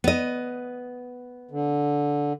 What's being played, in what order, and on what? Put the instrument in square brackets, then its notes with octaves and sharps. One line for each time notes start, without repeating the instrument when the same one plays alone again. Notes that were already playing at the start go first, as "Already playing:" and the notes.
[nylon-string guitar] B3 D#5
[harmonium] D3